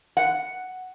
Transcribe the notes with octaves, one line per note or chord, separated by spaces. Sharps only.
F#5